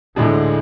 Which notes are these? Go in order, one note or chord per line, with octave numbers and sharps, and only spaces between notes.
D2 A2 D3 G#3 D4 G#4